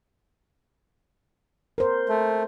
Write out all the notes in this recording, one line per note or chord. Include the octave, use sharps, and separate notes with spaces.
A#4 C5
A3